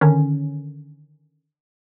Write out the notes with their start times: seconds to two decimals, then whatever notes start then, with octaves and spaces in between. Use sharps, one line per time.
0.01 D3 D#3 C#4